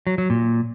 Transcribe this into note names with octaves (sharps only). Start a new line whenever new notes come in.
F#3
F#3
A#2